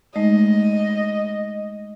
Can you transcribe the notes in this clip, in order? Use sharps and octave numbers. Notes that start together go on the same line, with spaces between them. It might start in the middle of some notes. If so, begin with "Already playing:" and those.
G#3 A3 D#4 D#5